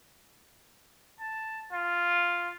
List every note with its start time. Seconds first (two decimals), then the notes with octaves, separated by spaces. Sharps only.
1.20 A5
1.72 F4